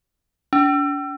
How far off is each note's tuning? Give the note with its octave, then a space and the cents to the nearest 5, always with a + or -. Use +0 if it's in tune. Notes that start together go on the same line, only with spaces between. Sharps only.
D4 -40